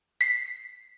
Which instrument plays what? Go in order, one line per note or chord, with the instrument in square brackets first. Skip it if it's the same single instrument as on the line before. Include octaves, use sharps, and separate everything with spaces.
[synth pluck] B6 C7